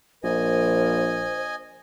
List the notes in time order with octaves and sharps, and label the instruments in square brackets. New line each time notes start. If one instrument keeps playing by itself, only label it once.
[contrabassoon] A#1 [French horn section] A#4 [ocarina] C5 [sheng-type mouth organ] D#5 G#5